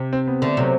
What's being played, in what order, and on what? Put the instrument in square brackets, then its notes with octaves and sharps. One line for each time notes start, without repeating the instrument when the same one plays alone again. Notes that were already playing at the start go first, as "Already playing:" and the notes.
Already playing: [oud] C3
[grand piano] C4
B3
[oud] D3 [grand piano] A3
[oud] C3 [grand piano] F#3